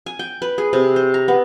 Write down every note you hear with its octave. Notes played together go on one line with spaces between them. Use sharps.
G#5
G5
B4
G#4
C3
C5
A#5
B3